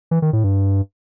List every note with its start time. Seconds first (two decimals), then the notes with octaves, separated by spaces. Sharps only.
0.11 E3
0.22 D#3
0.33 A2
0.44 G2